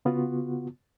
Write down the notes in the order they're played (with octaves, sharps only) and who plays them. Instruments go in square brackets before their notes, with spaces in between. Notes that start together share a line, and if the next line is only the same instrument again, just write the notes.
[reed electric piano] C#3 B3 F4 F#4